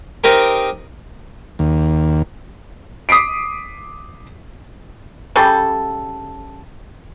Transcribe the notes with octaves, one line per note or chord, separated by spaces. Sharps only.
C4 D#4 G4 A#4
D#2
D6 D#6 B6 C7 D7
C#3 G3 G4 A4